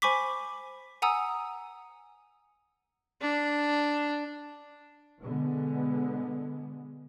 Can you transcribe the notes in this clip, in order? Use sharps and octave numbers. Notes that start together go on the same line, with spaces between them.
C5 G#5 B5 C#6 D6 B6
F#5 G#5 A#5 D#6 E6
D4
B2 D3 G#3 B3